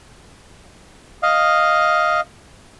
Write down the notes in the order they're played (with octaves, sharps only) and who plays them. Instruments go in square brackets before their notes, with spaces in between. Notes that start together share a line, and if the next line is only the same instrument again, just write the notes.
[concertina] D#5 F5